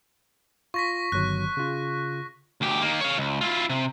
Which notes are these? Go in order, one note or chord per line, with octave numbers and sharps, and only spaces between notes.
F4 C#6 A#6 B6
G1 D#3 F#3 F#6
C#3 F4
D2 G4
D#3 A#3
C#5 F5
C#2
E4 F4
C3